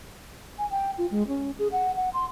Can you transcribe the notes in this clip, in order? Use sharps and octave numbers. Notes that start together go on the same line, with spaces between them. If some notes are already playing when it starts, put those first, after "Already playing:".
G#5
G5
F4
G#3
C#4
G#4
F#5
F#5
C6